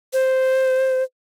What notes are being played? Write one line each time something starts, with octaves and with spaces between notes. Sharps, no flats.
C5